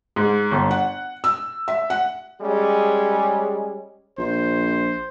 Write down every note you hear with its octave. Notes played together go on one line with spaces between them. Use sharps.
G#2
G1
F#5
E6
E5
F#5
G3 G#3 C#4 G#4
A#1 C5